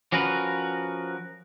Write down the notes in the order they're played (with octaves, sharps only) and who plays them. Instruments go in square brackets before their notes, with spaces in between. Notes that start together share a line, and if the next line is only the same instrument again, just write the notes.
[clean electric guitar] F3 C#4 F#4 A#4 B4